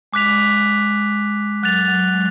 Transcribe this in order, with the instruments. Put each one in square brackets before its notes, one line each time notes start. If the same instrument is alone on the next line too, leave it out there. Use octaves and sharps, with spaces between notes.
[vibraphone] G#3 [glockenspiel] D6 F#6 B6 F7
[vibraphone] F#3 [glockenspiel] F#6 A6 F7
[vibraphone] F#3
F#3
G#3